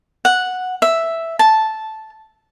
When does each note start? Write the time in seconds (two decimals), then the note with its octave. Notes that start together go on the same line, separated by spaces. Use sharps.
0.25 F#5
0.82 E5
1.39 A5